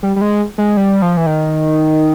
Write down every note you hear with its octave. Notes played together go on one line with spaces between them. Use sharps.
G3
G3
G#3
G#3
G3
F3
E3
D#3